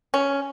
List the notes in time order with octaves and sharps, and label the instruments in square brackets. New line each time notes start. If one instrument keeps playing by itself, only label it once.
[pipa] C#4